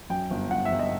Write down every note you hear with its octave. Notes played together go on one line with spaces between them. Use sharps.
F#2 G5
G1
G1 F#5
E5
G1
D#5